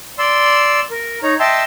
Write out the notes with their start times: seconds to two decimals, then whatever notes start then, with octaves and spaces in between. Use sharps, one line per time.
0.19 D5 C6 E6
0.90 A#4
1.23 D#4 C#5 A#5
1.40 D#5 E5 G5 A5 C6 E6